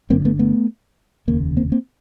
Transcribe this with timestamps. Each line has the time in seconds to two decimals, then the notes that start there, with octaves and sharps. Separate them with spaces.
0.10 G1 F#2 D3 A#3 C4
0.25 A3 B3
0.39 A3 B3
1.27 F1 D#2 C#3 A#3
1.57 A#3 C4
1.72 A#3 C4